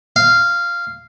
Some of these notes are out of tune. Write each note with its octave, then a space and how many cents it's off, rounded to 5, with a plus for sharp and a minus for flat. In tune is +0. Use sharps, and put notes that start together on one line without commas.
F5 -10